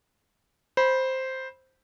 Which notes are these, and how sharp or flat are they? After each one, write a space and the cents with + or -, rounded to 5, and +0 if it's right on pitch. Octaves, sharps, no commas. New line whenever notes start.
C5 +0 B5 -15